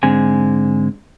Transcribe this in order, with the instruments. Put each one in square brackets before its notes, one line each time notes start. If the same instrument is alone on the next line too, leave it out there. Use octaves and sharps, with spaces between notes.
[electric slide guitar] G#2 D3 G#3 C4 G#5